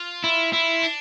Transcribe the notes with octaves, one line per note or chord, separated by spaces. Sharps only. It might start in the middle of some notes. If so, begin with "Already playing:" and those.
Already playing: F4
E4
E4
D4